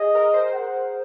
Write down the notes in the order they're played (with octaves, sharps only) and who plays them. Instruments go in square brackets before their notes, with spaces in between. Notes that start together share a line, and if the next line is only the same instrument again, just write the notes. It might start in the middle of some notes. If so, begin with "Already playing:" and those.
Already playing: [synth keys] G#4 [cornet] D#5
[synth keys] A#4
C5
[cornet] F#5